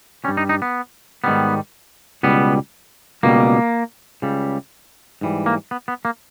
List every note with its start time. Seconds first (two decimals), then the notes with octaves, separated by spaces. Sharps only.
0.24 G3 C#4
0.28 G2
0.37 D#4
0.49 D#4
0.62 B3
1.24 G#2 D#3 G3 B3
2.23 C#2 B2 G3 B3
3.23 C#2 B2 G3 A#3
4.22 C#2 C#3 G3
5.21 G#2 E3 G3
5.46 A#3
5.71 B3
5.88 B3
6.05 A#3